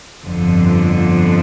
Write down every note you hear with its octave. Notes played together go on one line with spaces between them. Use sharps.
G1 F2 D3 F3